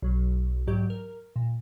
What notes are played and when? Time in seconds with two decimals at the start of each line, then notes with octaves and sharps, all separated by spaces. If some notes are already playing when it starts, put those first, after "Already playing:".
0.02 B1 F#3
0.67 E2 G#2 F#3 G4 G6
0.90 A#4
1.36 A#2